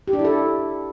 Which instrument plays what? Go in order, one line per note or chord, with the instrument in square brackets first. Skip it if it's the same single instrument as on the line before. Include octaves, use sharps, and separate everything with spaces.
[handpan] G4
D4
E4
A4